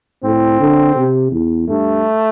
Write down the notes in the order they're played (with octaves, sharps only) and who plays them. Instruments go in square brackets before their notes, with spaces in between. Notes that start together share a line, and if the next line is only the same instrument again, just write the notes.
[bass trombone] A2 [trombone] C4
[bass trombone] D3
C3
E2
[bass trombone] G2 [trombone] A3